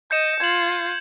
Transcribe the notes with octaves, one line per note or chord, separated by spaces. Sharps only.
D#5 G6 C#7 E7
F4 G#6 F#7